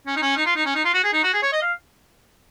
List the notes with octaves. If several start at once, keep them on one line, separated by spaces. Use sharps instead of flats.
C#4
D#4
C#4
D#4
F4
D#4
C#4
D#4
F4
F#4
G#4
D#4
F#4
G#4
C#5
D#5
F5